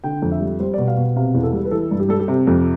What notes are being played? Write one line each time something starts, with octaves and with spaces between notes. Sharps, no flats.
D3 G5
F2
E5
G3
G3 C5
B2 D5
F5
B2
C3 F5
E2
A4
G3
B4
E3 A4
G2
G4
G3 A4
G4
C3
F2